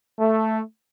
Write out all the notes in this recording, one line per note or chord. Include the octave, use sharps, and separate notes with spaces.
A3